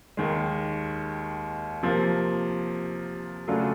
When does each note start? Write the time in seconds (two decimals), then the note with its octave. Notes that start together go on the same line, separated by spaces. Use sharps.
0.17 D#2 D#3 G#3
1.83 C3 F3 A#3
3.48 C#3 F#3 A3 D4 F4